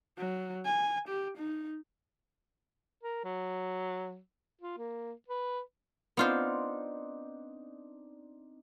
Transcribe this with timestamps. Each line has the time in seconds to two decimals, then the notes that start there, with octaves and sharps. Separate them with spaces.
0.18 F#3
0.65 G#5
1.08 G4
1.38 D#4
3.03 A#4
3.24 F#3
4.61 F4
4.78 A#3
5.28 B4
6.17 B3 C4 D4 D#4 F4 C5